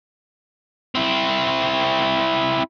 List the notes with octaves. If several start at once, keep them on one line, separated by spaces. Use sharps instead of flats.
C4 E4